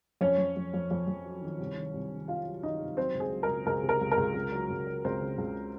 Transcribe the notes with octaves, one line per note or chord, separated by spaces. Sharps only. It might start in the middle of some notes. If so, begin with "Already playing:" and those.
F2 C#4 C#5
F2
F2
F2
F2
F2
F#3
D#3
C2
D#3
C2
D#3
C3 F4 F5
F#3
D#3 D#4 D#5
C3
F#3 C4 C5
C#2
G#4
F#3
A#4
C#2
C#2 A#4
C3
A#4
C#2
A#4
C#2
C#2
F#3
C#2
F#3
C#2 C4 C5
C#3
C#2